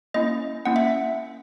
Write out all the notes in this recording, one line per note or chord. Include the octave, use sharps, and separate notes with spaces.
A#3 C#4 E4 D#5
A#3 C#4 E4 F#5
E5